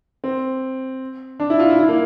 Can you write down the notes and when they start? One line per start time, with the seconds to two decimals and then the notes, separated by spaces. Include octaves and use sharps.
0.24 C4
1.40 D4
1.50 E4
1.59 F4
1.69 E4
1.79 E4
1.88 A#3